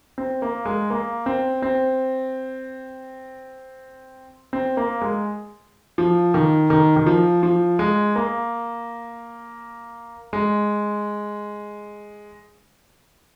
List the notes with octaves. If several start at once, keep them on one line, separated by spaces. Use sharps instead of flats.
C4
A#3
G#3
A#3
C4
C4
C4
A#3
G#3
F3
D#3
D#3
D#3
F3
F3
G#3
A#3
G#3